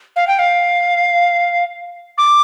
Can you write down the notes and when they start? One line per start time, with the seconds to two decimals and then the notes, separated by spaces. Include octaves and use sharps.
0.16 F5
0.27 G5
0.39 F5
2.18 D6